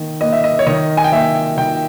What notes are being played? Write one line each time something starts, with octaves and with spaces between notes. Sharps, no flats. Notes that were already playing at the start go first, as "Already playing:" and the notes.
Already playing: D#3 A#3
A#3 D#5
E5
D#5
C#5
D#3 D#5
G#5
G5
A#3 E5
D#3 G5